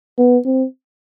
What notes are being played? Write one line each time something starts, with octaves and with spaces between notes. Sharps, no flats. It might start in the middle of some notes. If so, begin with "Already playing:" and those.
B3
C4